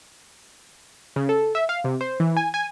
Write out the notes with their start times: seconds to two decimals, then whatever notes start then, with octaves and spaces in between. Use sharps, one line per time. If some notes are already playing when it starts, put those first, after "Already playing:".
1.16 C#3
1.29 A4
1.55 E5
1.69 F5
1.84 C3
2.01 C5
2.20 E3
2.37 G#5
2.54 G#5